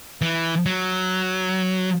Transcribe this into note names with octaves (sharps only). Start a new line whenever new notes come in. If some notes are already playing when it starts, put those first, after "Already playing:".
E3
F#3